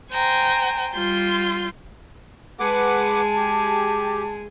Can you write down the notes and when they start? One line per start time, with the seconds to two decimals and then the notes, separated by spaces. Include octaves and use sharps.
0.12 C5 G5 G#5 A#5
0.93 G3 F4 C6 G6
2.60 G#3 G#4 B4 F#5 A5 D6
3.37 G4